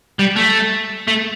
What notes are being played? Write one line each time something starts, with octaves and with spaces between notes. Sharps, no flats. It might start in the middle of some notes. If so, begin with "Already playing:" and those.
G3
A3
A3